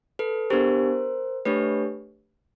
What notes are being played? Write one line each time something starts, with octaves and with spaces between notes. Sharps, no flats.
A4 B4
B3 D4 G4 A#4 C5
A3 D4 G4 B4 C#5